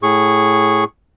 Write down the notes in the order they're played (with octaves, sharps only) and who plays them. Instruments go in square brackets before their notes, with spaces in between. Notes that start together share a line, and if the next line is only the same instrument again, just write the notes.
[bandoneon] A2 G#4 C#6